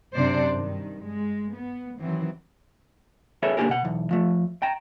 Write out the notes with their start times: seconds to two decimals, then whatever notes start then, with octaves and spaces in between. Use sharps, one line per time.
0.14 F#2 C3 D4 C5 D5
0.49 G2 D#3
1.05 G#3
1.54 B3
2.00 D#3 E3 F#3 C4
3.43 G#4 A4 B4 C#5 E5
3.57 A#3 D4 D#4 G4 G#4 A#4
3.69 B2 F#5
3.85 B1 E2
4.11 F3 A3
4.62 G5 A#5